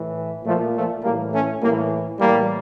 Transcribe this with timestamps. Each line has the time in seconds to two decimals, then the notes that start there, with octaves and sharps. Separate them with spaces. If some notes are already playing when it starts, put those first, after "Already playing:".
Already playing: A2 E3
0.44 A#2 F3 A3
0.74 F3 A3
1.03 A2 E3 G3 A#3
1.32 A3 C#4
1.61 A2 E3 G3 A#3
2.19 A2 E3 G3 A#3